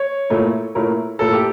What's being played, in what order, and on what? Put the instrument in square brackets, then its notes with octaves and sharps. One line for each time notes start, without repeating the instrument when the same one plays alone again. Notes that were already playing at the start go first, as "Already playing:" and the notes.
Already playing: [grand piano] C#5
[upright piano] A#2 A3 E4 A#4 C#5
A#2 A3 E4 A#4 C#5
[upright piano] A#2 A3 E4 A#4 C#5 [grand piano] A4
[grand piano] G4